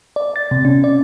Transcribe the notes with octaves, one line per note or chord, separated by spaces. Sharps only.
D5
A6
C3
C#4
D5